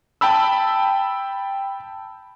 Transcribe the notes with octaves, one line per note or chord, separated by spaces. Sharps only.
G5 A5 B5 E6